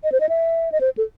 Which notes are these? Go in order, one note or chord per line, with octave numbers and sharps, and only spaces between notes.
D#5
C5
D#5
E5
D#5
C5
A4